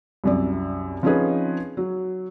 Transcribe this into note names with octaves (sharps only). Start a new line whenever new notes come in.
C2 F#2 D5
F3 C4 C#4 D#4 G#4 B4
F#3